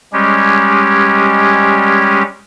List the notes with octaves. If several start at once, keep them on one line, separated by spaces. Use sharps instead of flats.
G3 G#3 C#4 G4